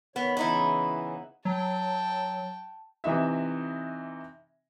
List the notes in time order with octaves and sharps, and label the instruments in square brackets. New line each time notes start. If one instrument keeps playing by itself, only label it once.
[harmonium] D#3 C#5 [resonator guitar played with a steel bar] B3
[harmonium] C#3 E3 [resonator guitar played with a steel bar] B3 D#4 E4
[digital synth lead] F#3 [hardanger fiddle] G5 A5
[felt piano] C3 E3 D#4 E5